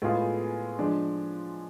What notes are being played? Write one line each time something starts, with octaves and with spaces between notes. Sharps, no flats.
A2 G#3 B3 F4 G#4
F3 G#3 D4